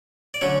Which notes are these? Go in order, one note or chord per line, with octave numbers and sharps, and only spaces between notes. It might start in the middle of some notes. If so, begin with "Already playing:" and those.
D5
D3 F#3 A3 C#4 C#5